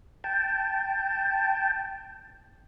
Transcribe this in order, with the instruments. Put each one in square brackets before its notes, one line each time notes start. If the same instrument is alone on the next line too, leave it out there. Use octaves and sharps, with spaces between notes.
[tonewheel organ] G5 A5